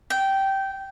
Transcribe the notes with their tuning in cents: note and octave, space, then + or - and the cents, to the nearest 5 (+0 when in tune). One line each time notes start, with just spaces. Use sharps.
G5 -15